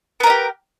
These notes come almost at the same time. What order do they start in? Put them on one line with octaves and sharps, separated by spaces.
B3 A#4 D#4 G4